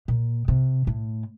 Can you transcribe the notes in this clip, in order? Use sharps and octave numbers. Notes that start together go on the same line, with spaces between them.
A#2
C3
A2